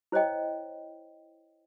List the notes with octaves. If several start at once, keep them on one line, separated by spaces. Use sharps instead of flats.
E4 C5 C#5 D#5 G5